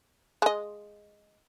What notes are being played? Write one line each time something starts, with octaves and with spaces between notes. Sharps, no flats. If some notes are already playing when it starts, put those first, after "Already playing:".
G#3 D#5